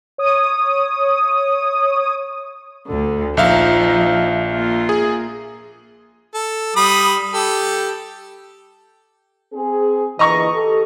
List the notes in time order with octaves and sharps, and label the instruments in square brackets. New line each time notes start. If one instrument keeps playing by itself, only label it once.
[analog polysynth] C#5 D#6
[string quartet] D2 D3
[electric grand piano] A#1 E5 F5 [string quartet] F3 D#4
[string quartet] A#3 F4
[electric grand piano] G#4
[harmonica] A4
G3 B5 D#6
G4 A4
[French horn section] C4 G#4
[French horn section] A#2 D3 E3 [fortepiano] D#5 A#5 C#6
[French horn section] G4 A4